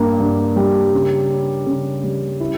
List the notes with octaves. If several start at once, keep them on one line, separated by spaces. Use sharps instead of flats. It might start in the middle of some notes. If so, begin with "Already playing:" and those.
Already playing: G2 A#3
G2
G3
C#3
C#4
C#3
G3
E4